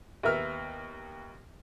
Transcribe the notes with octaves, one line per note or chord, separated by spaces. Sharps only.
D#2 B3 A#4 E5 F6